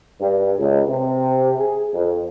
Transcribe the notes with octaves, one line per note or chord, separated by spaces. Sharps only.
G2
C#2
C3
G#4
F2